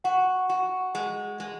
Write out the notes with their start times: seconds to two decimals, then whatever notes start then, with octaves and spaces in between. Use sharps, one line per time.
0.04 F#4 F#5
0.49 F#4
0.95 G#3
1.40 G#3